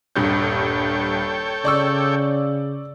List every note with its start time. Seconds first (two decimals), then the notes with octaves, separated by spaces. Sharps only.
0.16 D#1 G2 A4 C#5 G5 G6
1.65 C#3 D5 C#6 E6